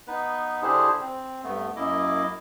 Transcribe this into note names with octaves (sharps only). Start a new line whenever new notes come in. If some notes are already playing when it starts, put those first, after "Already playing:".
B3 D#4 B4
D3 D4 E4 G4 G#4 C5
C4
G2 A3 B3
F#2 A#3 E4 D#5 D6